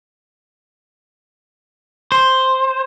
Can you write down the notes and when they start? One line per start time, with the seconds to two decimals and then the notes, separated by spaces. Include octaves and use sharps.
2.12 C5